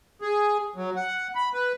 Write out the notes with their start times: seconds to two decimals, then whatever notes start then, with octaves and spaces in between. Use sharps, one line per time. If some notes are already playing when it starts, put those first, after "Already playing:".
0.21 G#4
0.76 F#3
0.96 F#5
1.35 B5
1.54 B4